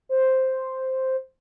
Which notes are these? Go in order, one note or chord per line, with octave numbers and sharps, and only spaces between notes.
C5